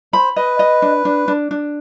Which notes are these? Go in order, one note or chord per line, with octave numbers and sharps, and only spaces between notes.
C5 B5
B4 D#5
D#5
D4
D4
D4
D4